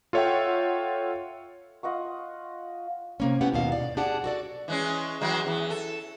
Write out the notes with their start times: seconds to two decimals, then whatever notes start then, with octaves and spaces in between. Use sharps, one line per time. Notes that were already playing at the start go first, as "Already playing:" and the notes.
0.13 F4 A4 C#5 E5 F#5 G5
1.83 F4 D#5 F#5 C#6
3.20 C3 A#3 C#4
3.41 B3 C#4 E4 G4 F#5
3.54 D#2 G#2 B2 F5
3.72 D5
3.97 D4 G4 G#4 D5 F#5 A5
4.24 F#4 A4 D5
4.68 E3 G#3 C#4
5.21 E3 F#3 G#3
5.46 E2 E3
5.70 A4